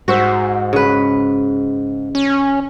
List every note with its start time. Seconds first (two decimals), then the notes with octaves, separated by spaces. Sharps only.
0.08 G#2 F#4 C5 E5
0.73 C#3 B4
2.15 C#4